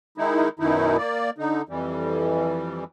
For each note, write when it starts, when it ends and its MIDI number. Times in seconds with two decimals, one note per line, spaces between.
0.18 0.49 51
0.18 0.49 56
0.18 0.49 63
0.18 0.49 64
0.59 0.97 42
0.59 0.97 47
0.59 0.97 51
0.59 0.97 63
0.59 0.97 64
0.97 1.30 58
0.97 1.30 74
1.38 1.62 50
1.38 1.62 63
1.69 2.84 41
1.69 2.84 52
1.69 2.84 55